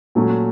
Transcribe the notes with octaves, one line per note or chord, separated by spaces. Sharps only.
A#2 F#3 A3 C#4